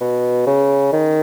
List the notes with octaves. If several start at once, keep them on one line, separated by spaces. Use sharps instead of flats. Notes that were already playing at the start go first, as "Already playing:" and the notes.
B2
C#3
D#3